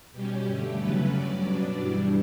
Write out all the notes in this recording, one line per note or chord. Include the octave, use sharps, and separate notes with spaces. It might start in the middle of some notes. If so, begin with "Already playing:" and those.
B2 G3 C#4 G4
G2 D3 A3 G4
E2 C#3 F#3 A3 C#4 B4
G2 F#3 C#4 D5
B2 F#3 B3 D4
G2 E3 G3 D4